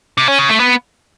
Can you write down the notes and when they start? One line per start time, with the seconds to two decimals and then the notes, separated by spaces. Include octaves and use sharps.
0.18 C3
0.28 C#4
0.39 C#3
0.49 A3
0.60 B3